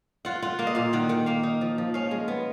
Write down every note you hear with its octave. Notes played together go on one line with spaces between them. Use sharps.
F4 F#5
F4 F#5
A#3 F5
D#5
A#2 F5
D#3 F#5
D#3 F#5
A#3 F5
D#4
F3
F3
C#4 F5
G#3
B3